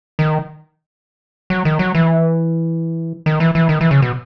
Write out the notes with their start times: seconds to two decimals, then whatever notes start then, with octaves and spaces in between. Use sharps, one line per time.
0.19 D#3
1.50 F#3
1.65 D#3
1.79 F#3
1.95 E3
3.26 D#3
3.40 E3
3.55 E3
3.69 D#3
3.81 E3
3.91 C#3
4.02 B2